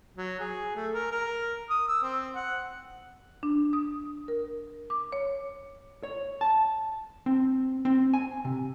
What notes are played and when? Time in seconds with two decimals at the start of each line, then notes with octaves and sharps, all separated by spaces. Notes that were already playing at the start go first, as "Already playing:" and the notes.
0.16 F#3
0.40 G#4
0.75 A3
0.94 A#4
1.11 A#4
1.70 D#6
1.88 E6
2.03 C4
2.35 F#5
3.43 D4
3.73 D#6
4.28 A#4
4.90 D6
5.12 C#5
6.03 C#5
6.41 A5
7.26 C4
7.85 C4
8.14 G#5
8.45 C3